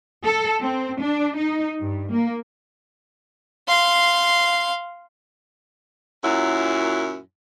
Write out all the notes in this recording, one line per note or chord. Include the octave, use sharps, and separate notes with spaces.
A4
C4
D4
D#4
G2
A#3
F5 C6
F#2 A#2 F#3 E4